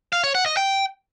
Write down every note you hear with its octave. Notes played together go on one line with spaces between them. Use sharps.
F5
C#5
F#5
D#5
G5